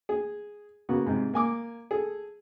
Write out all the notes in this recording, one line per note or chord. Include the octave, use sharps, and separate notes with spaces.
G#4
C#3 A#3 B3 F#4
G#2 C3
A#3 G#5 D6
G#4 A4